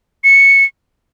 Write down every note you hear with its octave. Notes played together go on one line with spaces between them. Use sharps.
C#7